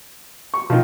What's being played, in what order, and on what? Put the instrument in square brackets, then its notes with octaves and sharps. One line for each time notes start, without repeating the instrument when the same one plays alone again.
[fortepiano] C#6
[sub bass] B2 [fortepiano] D#3 F3